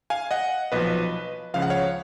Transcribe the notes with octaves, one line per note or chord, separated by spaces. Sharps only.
F5 G#5
D#5 F#5
B1 A#2 F3 B4 D#5
C#2 C#3 F3 F5
F#5
C#5 F5